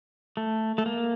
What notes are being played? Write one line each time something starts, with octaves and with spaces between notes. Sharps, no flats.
A3
A3
A#3